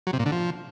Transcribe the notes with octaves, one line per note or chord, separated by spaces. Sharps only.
F#3
C3
A#2
D3
F3